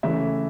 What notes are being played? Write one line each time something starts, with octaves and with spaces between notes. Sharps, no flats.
C#3 E3 A3 E5